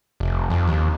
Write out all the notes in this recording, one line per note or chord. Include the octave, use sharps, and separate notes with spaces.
F1
F2
D#2